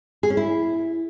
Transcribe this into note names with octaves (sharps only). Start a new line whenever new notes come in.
G#4
C#4
E4